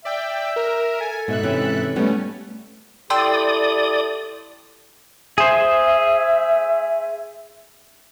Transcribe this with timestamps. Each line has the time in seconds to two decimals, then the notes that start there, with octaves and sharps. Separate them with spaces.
0.05 D5 E5 G5
0.56 A#4
1.00 A4 G#5
1.28 G#2 B2 E5 F#6
1.43 C3 E3 C#4
1.96 G3 A3 B3 C#4
3.10 E4 G4 A4 D5 G5 C6 D#6 E6
5.38 G#4 C5 E5